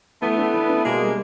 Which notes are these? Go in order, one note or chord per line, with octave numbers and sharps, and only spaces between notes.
E3 A3 B3
D4
E3
D4
B2 G#3 A#3
G3